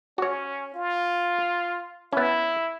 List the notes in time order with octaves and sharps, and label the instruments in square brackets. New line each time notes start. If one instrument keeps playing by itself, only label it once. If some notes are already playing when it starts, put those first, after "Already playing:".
[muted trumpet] C#4 [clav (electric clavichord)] F#4 C#5
[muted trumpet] F4
[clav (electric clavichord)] B3 C#4 [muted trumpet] E4